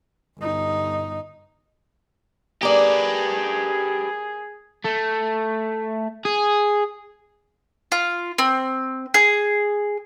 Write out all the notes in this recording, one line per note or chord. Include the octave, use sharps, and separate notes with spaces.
G1 D#4
A#3 G4 G#4 B4 D5
A3
G#4
F4
C4
G#4